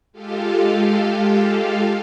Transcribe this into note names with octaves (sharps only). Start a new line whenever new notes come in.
G#3 F4 G4 A4 F5